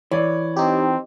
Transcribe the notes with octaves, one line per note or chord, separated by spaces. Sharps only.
E3 C#5 D5
C4 D#4 G4